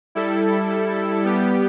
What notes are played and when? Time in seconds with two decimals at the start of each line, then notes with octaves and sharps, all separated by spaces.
0.15 G3 E4 A4
1.22 G3 B3 G4